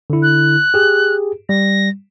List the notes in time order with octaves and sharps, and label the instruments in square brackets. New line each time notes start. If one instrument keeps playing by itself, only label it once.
[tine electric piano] D3 E4
[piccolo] F#6
[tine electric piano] G4 G#4
[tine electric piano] G3 [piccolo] A#6